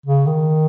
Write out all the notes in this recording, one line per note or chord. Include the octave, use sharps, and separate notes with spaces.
C#3
D#3